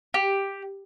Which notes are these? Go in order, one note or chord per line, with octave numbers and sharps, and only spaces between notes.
G4